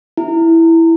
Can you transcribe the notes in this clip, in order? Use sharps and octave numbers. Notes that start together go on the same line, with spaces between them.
E4